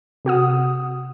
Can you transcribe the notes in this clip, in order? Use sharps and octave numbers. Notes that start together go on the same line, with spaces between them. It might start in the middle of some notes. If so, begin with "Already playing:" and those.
C3 F#4 F#5 D#6